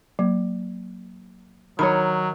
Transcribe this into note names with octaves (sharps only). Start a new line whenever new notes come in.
F#3 A#3
D#3 F#3 D#4 C#5 B5